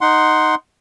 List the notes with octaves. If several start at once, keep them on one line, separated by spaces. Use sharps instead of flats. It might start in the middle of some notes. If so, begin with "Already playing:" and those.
D#4 F#5 C6